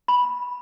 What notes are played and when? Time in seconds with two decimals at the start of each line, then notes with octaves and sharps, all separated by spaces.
0.08 B5